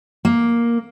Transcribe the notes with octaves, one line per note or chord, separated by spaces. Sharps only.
A#3